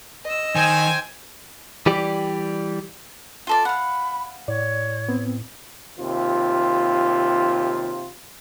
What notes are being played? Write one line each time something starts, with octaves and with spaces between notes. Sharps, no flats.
D#5 E6
D#3 C5 G5 G#5
E3 G3 G4 D5
F4 A4 D5
F5 F#5 B5
A2 C#5 D5
B3 C4
D#2 C3 F4